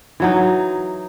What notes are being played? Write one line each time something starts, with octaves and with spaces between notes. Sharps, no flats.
E3 F#3 D#4